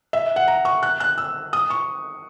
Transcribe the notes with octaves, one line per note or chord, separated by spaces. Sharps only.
E5
F#5
A#5
C#6
F#6
F#6
E6
D#6
C#6